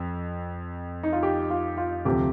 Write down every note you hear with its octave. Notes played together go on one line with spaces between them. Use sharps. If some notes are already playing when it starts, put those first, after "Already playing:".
Already playing: F2
D#4
F4
G4
F4
F4
D2 C3 F3 G4